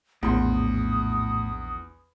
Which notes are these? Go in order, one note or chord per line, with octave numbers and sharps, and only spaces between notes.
A#1 E2 A2 C6 D#6